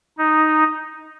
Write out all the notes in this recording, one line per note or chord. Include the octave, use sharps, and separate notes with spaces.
D#4